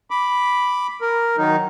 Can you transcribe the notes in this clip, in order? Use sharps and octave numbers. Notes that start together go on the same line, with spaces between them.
B5 D6
A#4
D#3 F#3 D#4